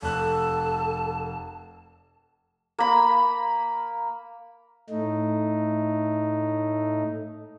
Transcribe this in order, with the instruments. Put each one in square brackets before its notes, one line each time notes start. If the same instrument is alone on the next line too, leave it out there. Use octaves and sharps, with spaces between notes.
[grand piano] F1 F#6 [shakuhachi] A4 [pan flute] A5
[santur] A#3 B5
[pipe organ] A2 A3 D#4